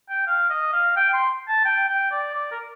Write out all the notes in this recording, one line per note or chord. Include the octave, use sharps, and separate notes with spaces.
G5
F5
D#5
F5
G5
C6
A5
G5
G5
D5
D5
A#4